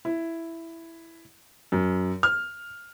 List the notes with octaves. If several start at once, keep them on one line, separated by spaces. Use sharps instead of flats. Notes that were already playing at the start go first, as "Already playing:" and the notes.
E4
F#2
F6